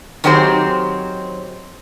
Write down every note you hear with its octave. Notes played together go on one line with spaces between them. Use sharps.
D#3 F#3 C4 G4 G#4 C5